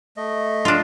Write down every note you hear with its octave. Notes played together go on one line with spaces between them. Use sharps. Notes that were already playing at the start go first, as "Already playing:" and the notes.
A3 D#5
D4 F4